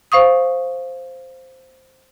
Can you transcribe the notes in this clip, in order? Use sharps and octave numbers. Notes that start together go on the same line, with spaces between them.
C5 F5 C#6 D#6